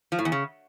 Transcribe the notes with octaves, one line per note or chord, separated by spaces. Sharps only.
F3
A2
E2
C#3